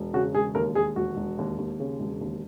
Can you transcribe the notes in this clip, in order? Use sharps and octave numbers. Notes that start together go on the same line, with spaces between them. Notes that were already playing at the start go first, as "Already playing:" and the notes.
Already playing: E1
C#3 F#4
E1 G#4
D#2 A#4
D#2 G#4
E1 F#4
E1
D#2
D#2
C#3
E1
D#2